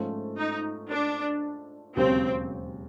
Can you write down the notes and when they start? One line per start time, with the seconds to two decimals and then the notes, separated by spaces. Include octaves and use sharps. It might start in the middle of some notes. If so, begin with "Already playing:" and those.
Already playing: G#2 F3 A3 C#4 F4
0.38 D#4
0.90 D4
1.96 E1 D#2 C#3 F#3 C4